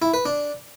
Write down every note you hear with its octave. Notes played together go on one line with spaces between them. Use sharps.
E4
B4
D4